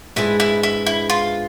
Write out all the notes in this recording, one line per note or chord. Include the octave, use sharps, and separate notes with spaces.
G#2 G#3 B3 D4 E4 G#4
E4
E4
E4
F4